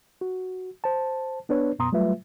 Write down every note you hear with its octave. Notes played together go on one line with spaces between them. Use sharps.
F#4
C5 A5
B3 D4 B4 C#5
F#2 B2 B3 A#5 C6 D#6
F#3 G3 A3 F4 B4 E5